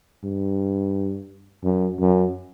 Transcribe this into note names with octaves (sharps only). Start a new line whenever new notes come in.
G2
F#2
F#2